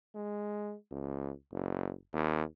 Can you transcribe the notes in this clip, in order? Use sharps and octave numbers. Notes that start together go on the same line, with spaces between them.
G#3
C#2
F#1
D#2